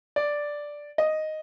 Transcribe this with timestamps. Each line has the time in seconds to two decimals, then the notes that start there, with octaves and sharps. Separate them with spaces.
0.16 D5
0.98 D#5